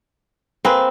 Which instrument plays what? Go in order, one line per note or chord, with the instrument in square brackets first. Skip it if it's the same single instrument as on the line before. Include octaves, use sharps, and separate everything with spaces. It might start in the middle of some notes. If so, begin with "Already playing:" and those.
[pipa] A#3 G#4 B4 [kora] C4